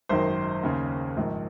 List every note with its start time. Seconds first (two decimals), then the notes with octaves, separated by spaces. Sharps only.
0.09 G#1 F#2 D#3 C5 C6
0.63 D#2 C#3
1.17 A#1 G#2 D#3